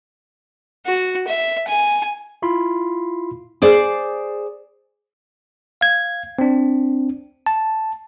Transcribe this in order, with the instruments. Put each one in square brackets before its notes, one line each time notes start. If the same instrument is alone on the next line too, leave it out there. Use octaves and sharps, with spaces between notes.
[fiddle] F#4
E5
G#5
[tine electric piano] E4 F4 B5 C6
[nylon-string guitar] G#4 C5 D5
[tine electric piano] F5 G#6
C4 D4
A5